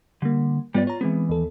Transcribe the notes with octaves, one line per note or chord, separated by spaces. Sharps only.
D3 G3 A#3
G#2 G3 B3 F4 D5
F4 C#5 A#5
E3 G#3 B3 C4
D#2 A4